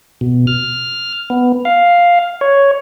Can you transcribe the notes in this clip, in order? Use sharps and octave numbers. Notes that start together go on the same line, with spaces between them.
B2
F6
B3
F5
C#5